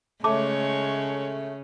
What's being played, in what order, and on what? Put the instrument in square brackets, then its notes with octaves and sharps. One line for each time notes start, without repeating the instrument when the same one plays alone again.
[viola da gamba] C#3 [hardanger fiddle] G#3 C#5 [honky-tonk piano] A3 [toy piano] A5 D6